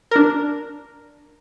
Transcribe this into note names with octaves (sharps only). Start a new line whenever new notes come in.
D4 A#4